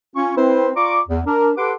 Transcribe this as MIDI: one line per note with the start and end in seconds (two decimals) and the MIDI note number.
0.16 0.34 61
0.16 0.34 65
0.16 0.34 85
0.37 0.70 60
0.37 0.70 64
0.37 0.70 71
0.37 0.70 72
0.76 1.00 65
0.76 1.00 74
0.76 1.00 82
0.76 1.00 85
0.76 1.00 86
1.08 1.21 40
1.26 1.52 62
1.26 1.52 70
1.57 1.73 67
1.57 1.73 69
1.57 1.73 71
1.57 1.73 78
1.57 1.73 84
1.57 1.73 86